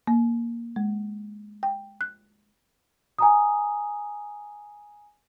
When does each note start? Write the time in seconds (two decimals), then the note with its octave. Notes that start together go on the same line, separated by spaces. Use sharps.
0.07 A#3
0.76 G#3
1.63 G5
2.01 F#6
3.19 G#5 A#5 D#6